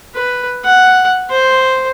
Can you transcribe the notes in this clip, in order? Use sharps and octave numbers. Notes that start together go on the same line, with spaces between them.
B4
F#5
C5